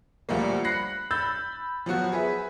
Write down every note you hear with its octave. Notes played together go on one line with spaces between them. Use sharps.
D2 F3 G3 A#3
B5 F#6 A#6 C7 C#7
B5 E6 G6 A6
F3 F#3 B3 F#4
G#4 B4 E5